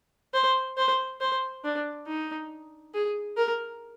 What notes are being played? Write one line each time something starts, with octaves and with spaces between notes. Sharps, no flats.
C5
C5
C5
D4
D#4
G#4
A#4